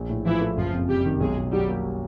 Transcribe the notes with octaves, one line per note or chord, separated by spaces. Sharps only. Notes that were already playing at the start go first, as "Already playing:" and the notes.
Already playing: A#1
A2
E3 F3 E4
A3
F#1 F3 F4
F2
C3 G3 G4
D#3
B1 G#3 G#4
B2
F#3 G3 G4
A#3